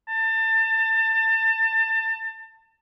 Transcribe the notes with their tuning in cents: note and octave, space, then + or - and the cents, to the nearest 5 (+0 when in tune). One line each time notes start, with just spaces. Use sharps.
A5 +30